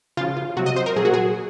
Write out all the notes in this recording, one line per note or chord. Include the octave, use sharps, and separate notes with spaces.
C#3 F3 F4
F4
C3 F#3 F#4
D#5
C5
A#4
A#2 F#3 G#4
F#4
G#4